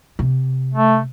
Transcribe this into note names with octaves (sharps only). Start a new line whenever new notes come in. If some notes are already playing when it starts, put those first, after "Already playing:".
C3
A3